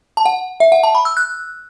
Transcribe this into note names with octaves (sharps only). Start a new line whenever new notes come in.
A5
F#5
E5
F#5
A5
B5
E6
F#6